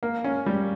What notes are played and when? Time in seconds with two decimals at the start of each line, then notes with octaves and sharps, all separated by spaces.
0.03 A#3
0.24 C#4
0.46 G3